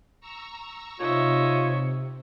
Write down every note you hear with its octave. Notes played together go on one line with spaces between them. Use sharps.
A#5 C#6 E6
C3 D#4 F4 C#5 E5